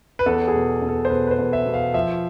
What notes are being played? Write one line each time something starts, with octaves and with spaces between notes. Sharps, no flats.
B4
E2 A4
G#4
B2
E2
A4
C5
B2 B4
B4
C5
E2
E5
B2
F5
F3 E5